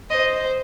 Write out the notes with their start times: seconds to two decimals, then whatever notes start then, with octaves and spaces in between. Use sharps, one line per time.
0.10 C5 D#5